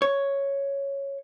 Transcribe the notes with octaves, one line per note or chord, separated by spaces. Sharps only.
C#5